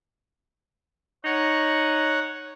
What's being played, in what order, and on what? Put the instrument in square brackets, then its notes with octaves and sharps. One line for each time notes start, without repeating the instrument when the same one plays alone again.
[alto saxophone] D#4 [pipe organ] C#5 F#5